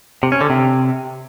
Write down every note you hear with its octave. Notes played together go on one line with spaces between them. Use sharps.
C3
C#4
D3
C3